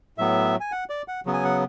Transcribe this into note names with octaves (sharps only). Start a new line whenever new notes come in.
A2 F#3 B3 E5
G#5
F#5
D5
F#5
C#3 F#3 B3
G#5
F#5